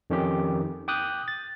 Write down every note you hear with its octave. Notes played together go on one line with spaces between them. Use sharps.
F2 D#3 C#4 G4
G5 D6 D#6 F#6 G6
A6